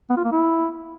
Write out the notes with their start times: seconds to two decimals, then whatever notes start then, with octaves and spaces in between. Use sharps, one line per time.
0.10 B3
0.17 F4
0.24 A#3
0.31 E4